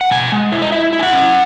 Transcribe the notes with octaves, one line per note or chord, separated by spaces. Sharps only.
F#5
B2 G#5
G#3
E4
D#5
E4 E5
E4
G#5
F#5
C#4